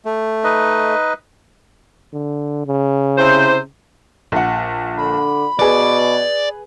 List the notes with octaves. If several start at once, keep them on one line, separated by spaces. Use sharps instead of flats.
A3
D#4 B4 D#5
D3
C#3
C3 E4 C5
A#1 F#5
D3 B5
B2 G#4 B4 D5